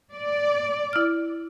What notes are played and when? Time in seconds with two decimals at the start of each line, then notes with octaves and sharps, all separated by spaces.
0.14 D5
0.93 E4 F6